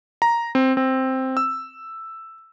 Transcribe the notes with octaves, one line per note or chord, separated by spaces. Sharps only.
A#5
C4
C4
E6